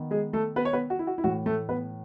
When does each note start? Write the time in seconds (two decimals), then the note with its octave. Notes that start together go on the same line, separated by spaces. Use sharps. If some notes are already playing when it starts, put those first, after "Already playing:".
Already playing: D#3 B3
0.11 G#3 G#4
0.33 A3 A4
0.56 B3 B4
0.65 C#5
0.73 B3 B4
0.90 F#4
0.99 E4
1.07 F#4
1.18 E4
1.24 A2 E3 A3 F#4
1.46 A3 A4
1.69 B3 B4